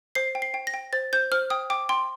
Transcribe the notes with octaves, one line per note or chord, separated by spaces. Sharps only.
C5 C7
G5
C7
G5
A#6
G5
C5 A6
C5 G6
C5 F6
G5 D#6
G5 D6
G5 C6